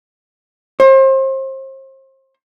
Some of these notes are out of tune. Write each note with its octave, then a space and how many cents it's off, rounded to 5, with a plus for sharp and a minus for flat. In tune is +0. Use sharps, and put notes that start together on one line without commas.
C5 +35